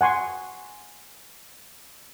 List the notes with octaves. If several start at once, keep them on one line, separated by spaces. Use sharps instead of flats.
F#5 G#5 C6 C#6